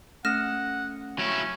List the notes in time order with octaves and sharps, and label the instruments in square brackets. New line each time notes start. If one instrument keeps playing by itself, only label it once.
[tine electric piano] A3 C#4 D#6 [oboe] F#5 [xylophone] F6 A#6 E7
[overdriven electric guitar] F#3 E4 [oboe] C#4